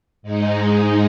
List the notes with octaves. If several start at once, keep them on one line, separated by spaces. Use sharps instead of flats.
G#2 G#3 D#4